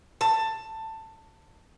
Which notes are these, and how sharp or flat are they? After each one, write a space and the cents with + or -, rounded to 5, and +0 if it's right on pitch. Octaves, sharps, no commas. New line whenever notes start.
A5 +15